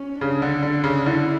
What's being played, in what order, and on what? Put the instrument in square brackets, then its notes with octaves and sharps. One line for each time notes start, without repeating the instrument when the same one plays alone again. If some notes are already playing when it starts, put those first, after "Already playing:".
Already playing: [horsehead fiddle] C#4
[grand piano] C#3 [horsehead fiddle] D4
[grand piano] D3
D3
C#3
[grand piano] D3 [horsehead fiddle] E4